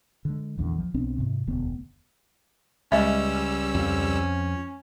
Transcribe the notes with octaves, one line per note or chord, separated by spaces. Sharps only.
D3 G#3
A#1 E2 D3 E3
F3
B1 B3 C4 D4
G#2 C3
E1 D2 D3 B3
C#2 G3 G#3 C#4 D#5 E5 E6
F2 F3